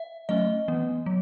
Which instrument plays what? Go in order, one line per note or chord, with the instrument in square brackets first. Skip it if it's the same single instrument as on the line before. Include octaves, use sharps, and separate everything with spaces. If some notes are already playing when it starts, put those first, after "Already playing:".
Already playing: [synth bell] E5
F#3 A3 C#4 D#5
E3 B3
F#3